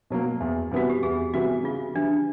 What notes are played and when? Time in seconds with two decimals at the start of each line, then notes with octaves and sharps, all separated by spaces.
0.10 B2 F#3 A#3
0.40 E2
0.72 C3 E3 G3 B3 F#4
0.89 G4
1.03 E2 G#4
1.34 C3 E3 G3 B3 F#4
1.64 C#3 F4
1.95 E3 G3 D4